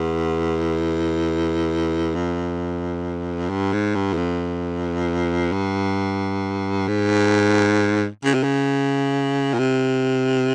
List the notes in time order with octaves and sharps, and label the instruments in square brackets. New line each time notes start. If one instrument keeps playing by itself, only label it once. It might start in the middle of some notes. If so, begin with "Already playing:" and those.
Already playing: [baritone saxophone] E2
F2
G2
G#2
G2
E2
F2
G2
G#2
C#3
C3
C#3
A#2
C3